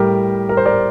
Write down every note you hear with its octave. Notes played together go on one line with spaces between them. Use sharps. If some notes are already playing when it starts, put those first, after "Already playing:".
Already playing: A2 G3 G4 A#4
A#4
C5
A#4 D5